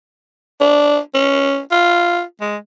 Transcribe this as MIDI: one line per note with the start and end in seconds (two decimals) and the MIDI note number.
0.61 0.99 62
1.14 1.59 61
1.71 2.22 65
2.41 2.56 56